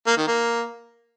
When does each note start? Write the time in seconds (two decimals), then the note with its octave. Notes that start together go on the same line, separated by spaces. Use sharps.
0.07 A#3
0.17 D#3
0.28 A#3